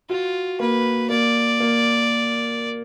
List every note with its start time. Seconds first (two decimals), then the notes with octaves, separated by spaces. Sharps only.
0.09 F4 F#4
0.60 A#3 B4
1.09 A#3 D5
1.60 A#3